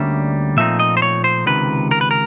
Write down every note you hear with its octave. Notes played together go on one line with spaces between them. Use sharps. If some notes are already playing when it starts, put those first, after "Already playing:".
Already playing: D2 D3 G3 A#3 C#4 E5
A#2 F3 A3 C4 D#4 E5
D#5
C5
C#5
C5
C#2 C3 D#3 B4
A#4
B4
A#4